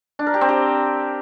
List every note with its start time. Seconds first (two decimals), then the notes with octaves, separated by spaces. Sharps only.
0.19 D4
0.26 A#4
0.34 G4
0.41 C4
0.49 G4